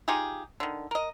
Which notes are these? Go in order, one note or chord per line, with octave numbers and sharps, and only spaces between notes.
D#4 F4 G4 G#4
D3 D#3
A#4 D#5